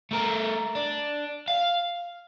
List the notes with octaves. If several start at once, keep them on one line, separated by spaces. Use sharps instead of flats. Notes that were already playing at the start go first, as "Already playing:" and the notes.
A3 A#4
D4
F5